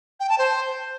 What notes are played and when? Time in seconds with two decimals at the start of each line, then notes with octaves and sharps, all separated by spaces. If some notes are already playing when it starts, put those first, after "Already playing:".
0.19 G5
0.29 A5
0.38 C5